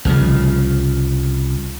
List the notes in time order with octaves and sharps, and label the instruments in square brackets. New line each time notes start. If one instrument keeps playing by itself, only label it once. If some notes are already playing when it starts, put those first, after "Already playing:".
[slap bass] C2 C#3 E3 F3